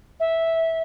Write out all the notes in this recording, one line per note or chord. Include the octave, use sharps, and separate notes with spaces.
E5